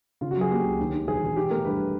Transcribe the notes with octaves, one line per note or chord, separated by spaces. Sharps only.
C#3 F4
F#4
F#3
G#4
A#3 G4
C#2
D#2
D#3
E1 G#4
E1
E3 G4
A3 A#4
G2 B4